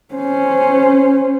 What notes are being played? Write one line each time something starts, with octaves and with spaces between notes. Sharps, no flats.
C#4 C5